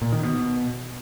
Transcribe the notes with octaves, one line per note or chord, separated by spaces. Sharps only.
A#2
D#3
B2